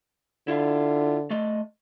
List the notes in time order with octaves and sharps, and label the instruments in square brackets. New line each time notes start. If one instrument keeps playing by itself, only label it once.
[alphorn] D3 [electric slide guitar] E4 F4 E5
[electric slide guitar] A3 D5 D#5